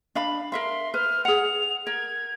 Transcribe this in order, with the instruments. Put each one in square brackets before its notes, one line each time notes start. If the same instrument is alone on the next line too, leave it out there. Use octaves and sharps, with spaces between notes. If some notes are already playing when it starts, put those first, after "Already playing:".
[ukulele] D4 F5 B5
[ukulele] A#4 E5 F5 [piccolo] C6
[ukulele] B4 [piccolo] F6
[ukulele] G#4 F#5 [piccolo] F7
[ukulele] A#4 [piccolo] G#6